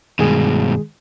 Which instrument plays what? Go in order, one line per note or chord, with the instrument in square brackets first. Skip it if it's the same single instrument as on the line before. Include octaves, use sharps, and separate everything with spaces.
[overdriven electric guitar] G2 B2 [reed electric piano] D#3 G#3 G#4